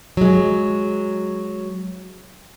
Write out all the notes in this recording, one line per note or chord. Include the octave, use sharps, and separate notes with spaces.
F#3 G#3